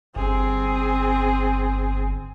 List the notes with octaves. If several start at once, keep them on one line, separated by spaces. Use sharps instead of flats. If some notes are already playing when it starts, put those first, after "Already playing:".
G1 C4 G#4